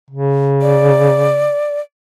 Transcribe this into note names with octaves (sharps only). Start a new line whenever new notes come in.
C#3
D5